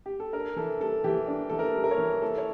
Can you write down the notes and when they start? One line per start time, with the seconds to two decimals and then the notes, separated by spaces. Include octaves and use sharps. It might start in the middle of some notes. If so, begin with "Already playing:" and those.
0.06 G4
0.20 A4
0.33 D4 A#4
0.56 E3 A4
0.80 G3 A4
1.04 E3 G4
1.28 D4
1.49 E3 A4
1.59 A#4
1.75 G3
1.84 A#4
1.91 C#5
1.98 E3
2.22 E4 A4
2.38 C#5